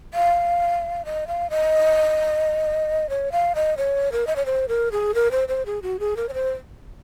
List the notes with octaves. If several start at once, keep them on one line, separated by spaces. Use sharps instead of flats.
F5
D#5
F5
D#5
C#5
F5
D#5
C#5
A#4
D#5
C#5
C5
A#4
G#4
A#4
C5
C5
G#4
F#4
G#4
A#4
C#5
C5